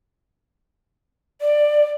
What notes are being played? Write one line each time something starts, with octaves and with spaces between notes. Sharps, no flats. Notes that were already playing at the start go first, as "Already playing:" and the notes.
D5